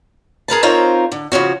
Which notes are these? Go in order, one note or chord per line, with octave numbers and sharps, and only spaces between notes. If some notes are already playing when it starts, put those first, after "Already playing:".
G#4 A#4 B4 A5
C4 D#4 F4 A#4 C5 C#5
D3
C#3 F3 C#4 F#4